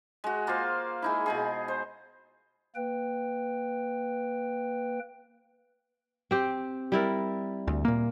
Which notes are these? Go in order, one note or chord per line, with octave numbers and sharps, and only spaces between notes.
G#3 F#4
A#3 F4 C5 F5
G#3 D#4 E4
B2 D#4 G#4
C5
A#3 B4 G5
C4 G4
G3 E4 A#4
D2
A#2 A#3